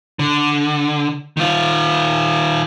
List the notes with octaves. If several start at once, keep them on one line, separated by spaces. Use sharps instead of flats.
D3
D#3 F4